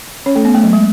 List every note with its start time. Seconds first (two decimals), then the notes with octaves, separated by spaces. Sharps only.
0.26 C#4 C#5
0.35 A3 A4
0.45 B3
0.55 A3
0.64 F#3
0.73 G#3